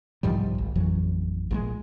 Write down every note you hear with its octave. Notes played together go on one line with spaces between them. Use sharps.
C2 G#2 F3 G3
G#1
A1 F2 E3 F#3
A#1 D3 G#3